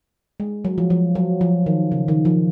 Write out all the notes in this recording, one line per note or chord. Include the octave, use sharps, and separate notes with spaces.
G#3
F#3
F3
F3
F#3
F3
D#3
C#3
D#3
F3